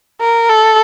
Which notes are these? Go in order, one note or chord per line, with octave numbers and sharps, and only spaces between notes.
A#4
A4